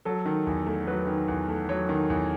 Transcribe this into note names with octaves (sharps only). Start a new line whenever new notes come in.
F#3 A4
D#3
E2
A3
F#3 B4
D#3
E2
A3
F#3 C#5
D#3
E2